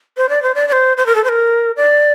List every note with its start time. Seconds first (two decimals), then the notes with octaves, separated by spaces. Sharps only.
0.17 C5
0.29 D5
0.43 C5
0.55 D5
0.68 D5
0.72 C5
0.97 C5
1.06 A#4
1.15 A4
1.24 C5
1.29 A#4
1.76 D5